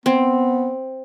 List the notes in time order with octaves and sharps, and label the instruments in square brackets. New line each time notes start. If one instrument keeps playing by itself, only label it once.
[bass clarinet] B3 [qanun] C4